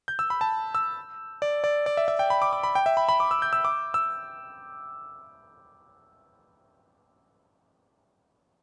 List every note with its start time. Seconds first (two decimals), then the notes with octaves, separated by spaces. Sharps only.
0.08 G6
0.19 E6
0.30 B5
0.41 A5
0.75 E6
1.42 D5
1.64 D5
1.86 D5
1.97 E5
2.08 E5
2.19 G5
2.30 B5
2.42 D6
2.53 D6
2.63 B5
2.75 G5
2.86 E5
2.97 B5
3.09 B5
3.20 D6
3.31 E6
3.42 G6
3.53 E6
3.65 D6
3.94 E6